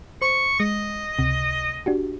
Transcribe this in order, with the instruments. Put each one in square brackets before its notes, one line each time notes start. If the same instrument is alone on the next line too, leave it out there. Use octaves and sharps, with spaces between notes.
[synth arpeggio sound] C5 [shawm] C#6
[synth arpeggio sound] G#3 [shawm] D#5
[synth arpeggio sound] C#2 C3
D4 F#4 G4